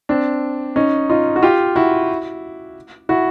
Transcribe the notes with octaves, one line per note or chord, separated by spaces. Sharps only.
C4 D4
C#4 D#4
D#4 F4
F#4
F4 G4
E4 F#4
E4 F#4